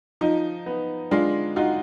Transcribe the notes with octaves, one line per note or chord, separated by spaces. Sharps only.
F3 D#4
B3
G#3 D4 F4
D#4 F4 F#4